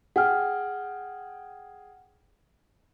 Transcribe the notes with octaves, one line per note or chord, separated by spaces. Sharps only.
G#4 F#5 G5 F6